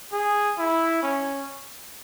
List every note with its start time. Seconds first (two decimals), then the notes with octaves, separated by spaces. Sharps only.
0.13 G#4
0.58 E4
1.03 C#4